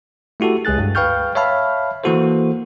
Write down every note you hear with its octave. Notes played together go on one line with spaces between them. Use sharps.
A3 E4 F#4 G4 A4
C#2 G#3 G#4 F#6 A6
G2
B4 F5 G5 C#6 F6 G6
C#5 E5 F5 A5 B5 F6
E3 A#3 E4 F#4 A4 C5